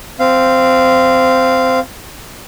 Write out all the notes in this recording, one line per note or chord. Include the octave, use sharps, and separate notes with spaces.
C4 F5